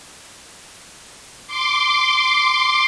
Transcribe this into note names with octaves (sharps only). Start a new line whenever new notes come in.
C6 D6